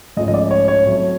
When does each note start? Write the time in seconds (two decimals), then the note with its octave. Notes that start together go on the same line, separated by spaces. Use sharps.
0.17 G#2 F3 A3 C#4 D#5
0.28 D#5
0.34 D5
0.51 C#5
0.68 C#5
0.85 A2 F#3 A3 C4